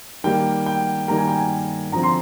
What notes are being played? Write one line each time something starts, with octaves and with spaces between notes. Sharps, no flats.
D#3 G3 A#3 G5
G5
D#3 G3 A#3 A#5
G#5
G5
G#5
D3 F3 C4 A#5
C6